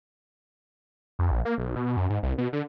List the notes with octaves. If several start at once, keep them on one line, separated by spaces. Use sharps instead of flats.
F2
A#1
A#3
B1
B2
F#2
G#2
C2
B2
D3